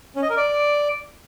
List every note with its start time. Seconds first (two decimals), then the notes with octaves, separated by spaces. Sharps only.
0.16 C#4
0.23 D#5
0.30 A#4
0.36 D5